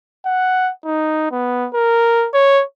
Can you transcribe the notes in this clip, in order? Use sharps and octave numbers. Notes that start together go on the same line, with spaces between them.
F#5
D#4
B3
A#4
C#5